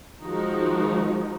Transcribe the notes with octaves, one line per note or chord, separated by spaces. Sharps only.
D#3 F3 G#3 D#4 F#4